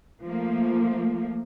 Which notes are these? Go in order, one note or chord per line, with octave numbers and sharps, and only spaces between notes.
F3 A3 A#3